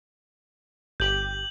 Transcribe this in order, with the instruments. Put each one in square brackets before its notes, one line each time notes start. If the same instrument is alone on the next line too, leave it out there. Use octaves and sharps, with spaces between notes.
[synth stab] G1 G4 [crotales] G6 F#7